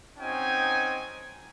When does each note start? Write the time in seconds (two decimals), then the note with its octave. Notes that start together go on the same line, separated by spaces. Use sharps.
0.18 C4 C#4 D#4 F#4 G5 G#5